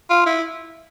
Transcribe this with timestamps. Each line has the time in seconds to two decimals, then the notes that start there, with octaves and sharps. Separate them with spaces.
0.10 F4
0.26 E4